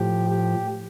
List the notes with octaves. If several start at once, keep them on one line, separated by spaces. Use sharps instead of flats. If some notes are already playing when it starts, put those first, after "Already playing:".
Already playing: A2 F3 G4
G4